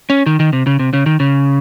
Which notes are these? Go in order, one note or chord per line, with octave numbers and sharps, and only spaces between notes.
C#4
D#3
D#3
C3
C#3
C3
C#3
D#3
C#3